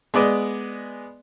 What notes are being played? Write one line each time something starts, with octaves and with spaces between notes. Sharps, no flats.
G#3 B3 D5 D#5